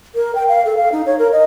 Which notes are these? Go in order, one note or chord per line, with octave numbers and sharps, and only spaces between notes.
A#4
G5
F5
A4
F5
D#4
C#5
A#4
D#5